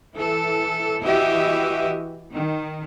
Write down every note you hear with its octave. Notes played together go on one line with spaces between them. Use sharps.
E3 A4
E3 E4 F#4 G4 D#5 E5
D#3